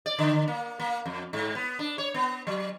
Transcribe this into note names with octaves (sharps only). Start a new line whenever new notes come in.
D5
D3
A#3
A#3
F2
G#2
B3
D4
C#5
B3
F#3